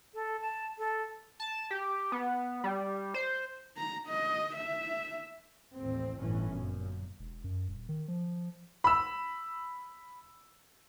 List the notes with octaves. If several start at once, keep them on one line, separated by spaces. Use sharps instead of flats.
A4
A5
A4
A5
G4
B3
G3
C5
A#5
D#5
E5
A1 D#2 C4
G1 A2 E3 C#4
F#2 A#2
E1
F#2
D#1
D#3
F3
B5 E6